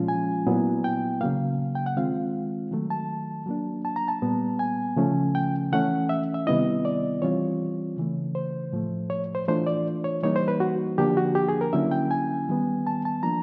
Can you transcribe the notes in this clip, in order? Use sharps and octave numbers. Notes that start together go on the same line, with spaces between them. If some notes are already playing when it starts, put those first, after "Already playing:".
Already playing: A#2 F3 G#3 C#4 F4
G#5
A#2 F#3 B3 E4
G5
C#3 F#3 A#3 F5
G5
F#5
D#3 G#3 C4 F4 F5
D#3 F#3 A3
A5
F#3 A#3 D4
A5
A#5
A5
A#2 G3 B3
G#5
C#3 F3 A3 C#4
G5
E3 A3 C#4 F#5
E5
E5
C3 D#3 G3 B3 E4 D#5
D5
E3 G3 C4 F4 C#5
C#3 E3 A3
C5
A2 F3 A3
C#5
C5
E3 A3 D4 F4 C5
D5
C#5
E3 G3 A#3 D#4 C#5
C5
B4
F#4
D3 F3 A#3 D4 G4
F#4
G4
G#4
A#4
D3 F#3 A#3 C#4 E4 E5
G5
G#5
D#3 G3 B3
A5
A5
F3 A#3 D4 A#5